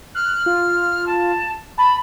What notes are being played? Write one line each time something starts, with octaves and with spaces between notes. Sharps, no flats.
F6 F#6
F4
A5
A5 B5